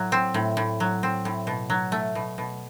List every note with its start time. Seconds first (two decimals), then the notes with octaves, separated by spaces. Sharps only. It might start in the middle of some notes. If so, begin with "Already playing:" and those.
Already playing: A2 F#3
0.12 C4
0.34 A2
0.57 A2
0.80 F#3
1.03 C4
1.25 A2
1.47 B2
1.70 F#3
1.92 A3
2.15 B2
2.38 B2